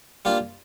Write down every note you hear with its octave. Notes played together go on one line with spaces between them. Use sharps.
G3 A#3 D4 F4